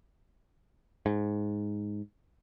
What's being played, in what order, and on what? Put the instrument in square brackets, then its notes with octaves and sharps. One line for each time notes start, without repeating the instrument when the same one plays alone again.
[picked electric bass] G#2